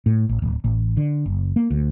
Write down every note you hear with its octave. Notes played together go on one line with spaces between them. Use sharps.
A2
A1
D1
A1
D3
F#1
A#3
D2